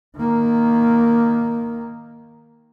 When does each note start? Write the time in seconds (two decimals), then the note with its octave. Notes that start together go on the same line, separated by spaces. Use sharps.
0.17 D#3 A#3